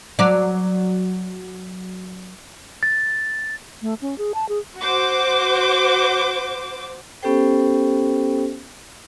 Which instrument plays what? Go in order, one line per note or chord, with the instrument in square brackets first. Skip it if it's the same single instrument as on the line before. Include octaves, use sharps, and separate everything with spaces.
[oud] F#3 D5
[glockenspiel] A6
[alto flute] A3
C#4
G#4
A5
G#4
[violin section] F#4 C5 D6
[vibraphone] B3 C#4 G4 A4 C5 G5